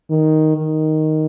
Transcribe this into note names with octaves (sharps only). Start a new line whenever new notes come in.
D#3
D#3